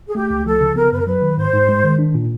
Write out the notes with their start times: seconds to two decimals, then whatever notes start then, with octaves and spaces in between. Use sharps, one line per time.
0.08 G#4
0.15 A3 G4
0.30 C#2
0.46 F3 A4
0.61 C#3
0.76 B3 A#4
0.92 F#2 B4
0.99 A#4
1.05 F#3 B4
1.22 D#3
1.38 G#2 C5
1.53 G#2
1.69 G#3
1.84 D#3
1.99 D4
2.15 A#2